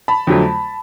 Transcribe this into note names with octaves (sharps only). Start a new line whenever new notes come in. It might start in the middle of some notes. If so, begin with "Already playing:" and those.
A5 B5
F2 D3 F#3 A3